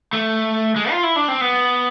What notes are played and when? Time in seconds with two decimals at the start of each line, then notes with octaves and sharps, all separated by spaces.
0.13 A3
0.76 G#3
0.91 F4
1.03 E4
1.16 D4
1.28 C4
1.41 B3